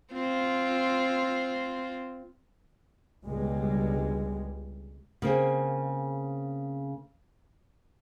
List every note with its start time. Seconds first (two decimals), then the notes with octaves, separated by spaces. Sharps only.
0.13 C4 F4
3.26 C#2 B2 D3 G3 G#3
5.22 C#3 A#3 C4 G#4